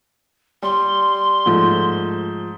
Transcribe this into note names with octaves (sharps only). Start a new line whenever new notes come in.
G3 C6
G#2 F3 A3